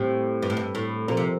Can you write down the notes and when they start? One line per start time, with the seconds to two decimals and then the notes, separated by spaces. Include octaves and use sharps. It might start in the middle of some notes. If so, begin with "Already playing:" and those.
Already playing: A2 G3 C4 G4
0.42 G2
0.50 A2
0.57 G2
0.75 A2
1.08 A#2 F3 C4 G4 A#4
1.17 C3